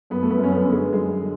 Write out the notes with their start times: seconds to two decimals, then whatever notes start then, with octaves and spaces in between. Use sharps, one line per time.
0.10 F#2 B3
0.23 A3
0.30 B3
0.38 F#2
0.43 C#4
0.51 B3
0.66 D3
0.72 G#3
0.93 F#2 G#3
1.20 D3